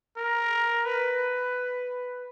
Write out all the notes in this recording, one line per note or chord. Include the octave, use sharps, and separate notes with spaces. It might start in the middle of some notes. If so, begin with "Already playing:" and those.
A#4
B4